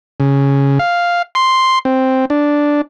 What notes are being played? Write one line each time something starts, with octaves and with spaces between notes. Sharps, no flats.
C#3
F5
C6
C4
D4